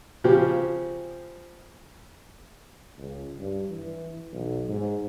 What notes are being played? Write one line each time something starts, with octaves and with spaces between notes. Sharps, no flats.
C#3 F3 C4 G4
C#2
G2
E3
B1
G#2